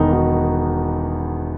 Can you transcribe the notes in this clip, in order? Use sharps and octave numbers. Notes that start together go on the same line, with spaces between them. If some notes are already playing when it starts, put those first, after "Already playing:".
Already playing: E1 E2 D#3 B3 D#4
D#4 F#4